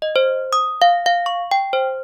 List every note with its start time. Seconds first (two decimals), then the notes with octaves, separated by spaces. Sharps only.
0.02 D#5
0.16 C5
0.53 D#6
0.82 F5
1.06 F5
1.26 C#6
1.51 G5
1.73 C5